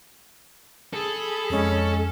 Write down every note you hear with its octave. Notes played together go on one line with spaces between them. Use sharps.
G#4 A4 B5
F2 G#3 C#4